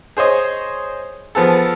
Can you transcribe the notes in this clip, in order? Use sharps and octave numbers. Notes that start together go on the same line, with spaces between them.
G#4 C5 C#5 D#5
F3 B3 G#4 A4